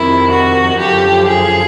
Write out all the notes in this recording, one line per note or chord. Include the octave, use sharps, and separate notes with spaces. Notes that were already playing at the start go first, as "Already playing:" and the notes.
Already playing: F2 C3 D#3 E4
F#4
F#2 D3 F3 G4
G#4